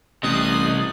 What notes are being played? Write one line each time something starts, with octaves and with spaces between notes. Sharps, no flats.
A1 C3 G3 D#5 D#6 F#6 C7